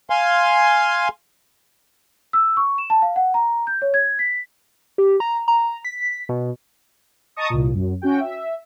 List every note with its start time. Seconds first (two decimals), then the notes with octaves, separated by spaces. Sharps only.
0.10 F5 G#5 C6
2.33 E6
2.57 C#6
2.78 E7
2.90 A5
3.02 F5
3.16 F#5
3.34 A#5
3.67 G6
3.82 C#5
3.94 G#6
4.19 B6
4.98 G4
5.20 A#5
5.48 A#5
5.85 B6
6.29 B2
7.36 D#5 A5 A#5 C#6 D#6
7.50 C2 A#2
7.74 F#2
8.02 C#4 F#4 G5
8.20 E5